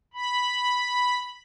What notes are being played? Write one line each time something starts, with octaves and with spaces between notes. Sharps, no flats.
B5